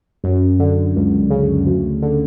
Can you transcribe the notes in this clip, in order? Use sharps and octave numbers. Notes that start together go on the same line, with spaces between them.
F#2
D3
C#2
C#3
D2
D3